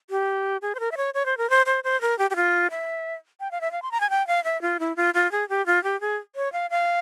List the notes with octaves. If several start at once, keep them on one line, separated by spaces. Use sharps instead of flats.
G4
G#4
C5
A#4
E5
C#5
C#5
C5
A#4
C5
C5
C5
A#4
G4
G4
F4
E5
G5
F5
E5
F5
C6
A#5
G#5
G5
F5
E5
F4
E4
F4
F4
G#4
G4
F4
G4
G#4
C#5
F5
F5